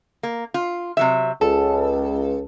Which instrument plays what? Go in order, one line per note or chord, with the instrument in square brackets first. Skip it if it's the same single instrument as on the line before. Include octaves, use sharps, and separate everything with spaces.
[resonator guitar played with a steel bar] A#3
F4
C3 F#3 E5
[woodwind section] C#2 [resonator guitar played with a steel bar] A4